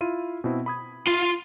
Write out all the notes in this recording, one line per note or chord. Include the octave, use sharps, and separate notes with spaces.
E4 F4 D#7
B2 C4 E4
B5 D#6 G#6
F4 C6